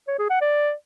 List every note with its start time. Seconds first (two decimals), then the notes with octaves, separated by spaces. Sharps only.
0.08 C#5
0.19 G#4
0.30 F#5
0.41 D5